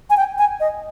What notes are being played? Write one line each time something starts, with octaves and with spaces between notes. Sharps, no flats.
G#5
G5
G#5
D#5